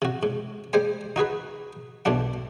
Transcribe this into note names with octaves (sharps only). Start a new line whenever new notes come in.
C3 F#4
G#2
G3 G#3 C5 G#5
D#4 F#4 G#4 B4
B1 B2 E3 D4 F#5